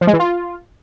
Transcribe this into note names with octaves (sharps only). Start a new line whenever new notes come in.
F3
G#3
E3
F4